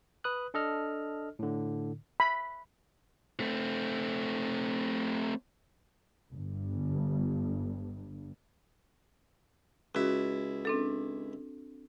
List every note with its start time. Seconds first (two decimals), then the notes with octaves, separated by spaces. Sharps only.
0.24 B4 D#6 F#6
0.54 D4 A4 D#5 F6
1.39 A2 D3
2.20 B5
3.40 A3 C4
6.31 G1 G2
9.95 C#2 E4 F#4
10.65 C4 D4 A4